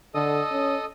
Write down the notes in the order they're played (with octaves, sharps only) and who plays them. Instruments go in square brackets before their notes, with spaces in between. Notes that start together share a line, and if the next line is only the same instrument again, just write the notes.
[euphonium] D3 [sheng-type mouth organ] A4 D#5 D#6
[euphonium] C#4